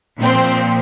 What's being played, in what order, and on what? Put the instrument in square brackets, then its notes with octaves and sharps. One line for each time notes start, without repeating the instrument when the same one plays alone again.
[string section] A#2 F3 C4